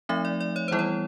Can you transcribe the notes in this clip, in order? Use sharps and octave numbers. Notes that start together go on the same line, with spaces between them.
F3 A3 C4 D#4 E5
D5
D5
C#5
E3 G3 B3 E4 C5
C#5